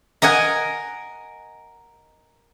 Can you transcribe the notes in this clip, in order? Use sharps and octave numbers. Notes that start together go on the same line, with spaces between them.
A#4 D#5 F#5 G#5